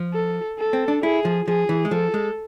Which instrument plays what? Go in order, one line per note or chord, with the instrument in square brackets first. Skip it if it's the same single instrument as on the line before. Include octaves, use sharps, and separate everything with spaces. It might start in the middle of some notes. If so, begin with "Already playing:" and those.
Already playing: [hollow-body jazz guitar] F3
[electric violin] A4
A4
[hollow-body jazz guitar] C4
D4
[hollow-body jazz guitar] E4 [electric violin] G#4
[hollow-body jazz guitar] F3
[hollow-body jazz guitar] F3 [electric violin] G#4
[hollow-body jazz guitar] E3
G#3
[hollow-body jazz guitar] F3 [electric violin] A4
[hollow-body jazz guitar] G#3